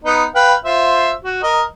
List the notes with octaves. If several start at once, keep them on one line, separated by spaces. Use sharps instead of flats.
B3 D#4
B4 F5 G5
F4 C5 E5
F#4
A#4 D#5